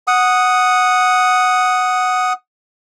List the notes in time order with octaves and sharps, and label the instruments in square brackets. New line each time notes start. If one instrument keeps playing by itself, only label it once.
[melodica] F#5 D#6